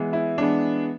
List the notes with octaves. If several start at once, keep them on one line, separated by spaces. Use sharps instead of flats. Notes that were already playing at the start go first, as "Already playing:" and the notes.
Already playing: E3 G#3 B3
E4
E3 G#3 B3 D4